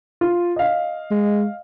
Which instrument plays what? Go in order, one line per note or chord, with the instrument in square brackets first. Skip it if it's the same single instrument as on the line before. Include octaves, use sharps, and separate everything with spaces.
[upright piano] F4
D#5 F5
[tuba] G#3